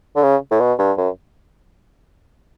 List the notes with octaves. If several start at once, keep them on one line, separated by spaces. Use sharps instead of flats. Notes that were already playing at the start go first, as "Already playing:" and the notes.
D3
C#3
A2
B2
G2
F#2